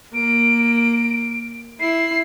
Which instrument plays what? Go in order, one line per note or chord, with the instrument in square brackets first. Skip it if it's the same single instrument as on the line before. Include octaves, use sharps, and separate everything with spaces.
[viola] A#3 [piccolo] D7
[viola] E4 [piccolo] C7